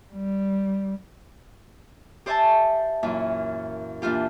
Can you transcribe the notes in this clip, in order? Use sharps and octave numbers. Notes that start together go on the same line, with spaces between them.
G3
G4 C5 D5 E5 G#5 A5
F#2 A#2 E3
A#2 E3 D4 F4 G4